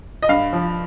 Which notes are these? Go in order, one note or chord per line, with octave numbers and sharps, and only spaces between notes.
D#5
G2 F5
F3